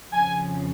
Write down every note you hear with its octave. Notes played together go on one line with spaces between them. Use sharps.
F2 C#3 F3 G#5